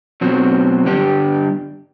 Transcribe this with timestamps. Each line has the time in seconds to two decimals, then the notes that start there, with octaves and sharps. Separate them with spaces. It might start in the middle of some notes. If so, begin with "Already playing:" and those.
0.21 B2 F#3 C4
0.85 G2 D3 G3 D4 G4